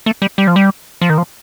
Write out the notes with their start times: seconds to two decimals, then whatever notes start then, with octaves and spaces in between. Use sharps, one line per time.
0.06 A3
0.22 G3
0.38 G3
0.47 F3
0.56 G3
1.01 F3
1.10 D#3
1.18 F3